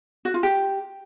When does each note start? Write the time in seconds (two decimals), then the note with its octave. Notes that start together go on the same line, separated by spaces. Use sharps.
0.25 F#4
0.34 F4
0.43 G4